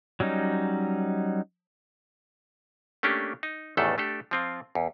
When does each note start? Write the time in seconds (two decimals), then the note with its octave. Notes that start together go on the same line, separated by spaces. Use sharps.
0.20 F#3 G3 C#4 D#4
3.03 A3 A#3 C#4 D4 G4
3.43 D#4
3.77 A1 E2 D#3 E3 A3 A4
3.98 A3 D4 G4 A4
4.31 F3 C4 F4
4.75 E2